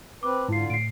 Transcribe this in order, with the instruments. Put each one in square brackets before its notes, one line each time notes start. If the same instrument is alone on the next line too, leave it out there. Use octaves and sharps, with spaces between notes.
[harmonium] C4 B4 [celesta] D6
[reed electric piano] G#2 [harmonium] D3 F4 [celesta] E4 C7
[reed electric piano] A2 [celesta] C7 D7